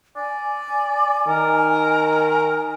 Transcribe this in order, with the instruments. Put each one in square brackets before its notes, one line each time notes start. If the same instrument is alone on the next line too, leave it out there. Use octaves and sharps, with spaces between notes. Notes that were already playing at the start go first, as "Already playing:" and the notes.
[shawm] D5 [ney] G#5
[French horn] D#3 [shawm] A#4